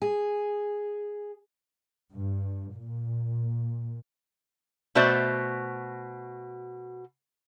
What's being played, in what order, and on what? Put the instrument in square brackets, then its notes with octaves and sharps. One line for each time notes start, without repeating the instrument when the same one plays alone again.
[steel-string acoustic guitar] G#4
[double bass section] G2
A#2
[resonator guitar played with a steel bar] B2 A3 F#4 C5 D5 E5